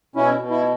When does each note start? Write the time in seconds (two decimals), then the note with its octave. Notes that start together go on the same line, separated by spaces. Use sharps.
0.15 B2 C#4 E4
0.39 B2
0.50 E4